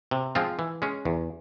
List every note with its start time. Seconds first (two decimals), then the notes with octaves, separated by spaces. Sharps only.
0.11 C3
0.35 F3 G#3 C4 F4
0.59 E3
0.82 G#3 C#4
1.05 E2